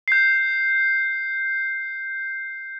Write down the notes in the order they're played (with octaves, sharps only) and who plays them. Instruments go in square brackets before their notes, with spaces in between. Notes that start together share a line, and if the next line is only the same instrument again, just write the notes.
[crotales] G6 C7